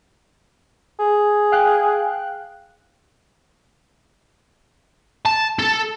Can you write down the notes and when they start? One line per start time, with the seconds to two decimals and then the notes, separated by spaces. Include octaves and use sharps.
0.99 G#4
1.52 F5 G5 F#6
5.26 A5
5.59 A4